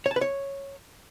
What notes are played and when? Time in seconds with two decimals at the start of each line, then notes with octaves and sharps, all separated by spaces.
0.06 C#5
0.11 A5
0.16 B4
0.21 C#5